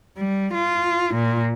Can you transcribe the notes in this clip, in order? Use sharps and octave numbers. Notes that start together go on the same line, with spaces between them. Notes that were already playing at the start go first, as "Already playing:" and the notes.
G3
F4
A#2